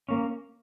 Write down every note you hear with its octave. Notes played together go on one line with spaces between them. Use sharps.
A#3 C#4